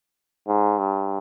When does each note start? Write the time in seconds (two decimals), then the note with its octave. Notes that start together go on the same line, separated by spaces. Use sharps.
0.48 G#2
0.79 G2